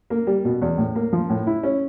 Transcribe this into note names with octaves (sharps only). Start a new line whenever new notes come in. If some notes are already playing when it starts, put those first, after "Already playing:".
A#3
G3
B2
E2
A2
A#3
F3
A2
E4
C#4